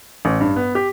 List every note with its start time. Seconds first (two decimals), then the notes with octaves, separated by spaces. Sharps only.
0.25 A1
0.40 G2
0.56 B3
0.75 G4